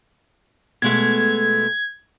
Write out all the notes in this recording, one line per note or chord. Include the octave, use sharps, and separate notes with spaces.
B2 G#3 A3 G#6